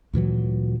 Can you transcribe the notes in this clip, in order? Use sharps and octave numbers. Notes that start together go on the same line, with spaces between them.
D2 A#2 E3 F#3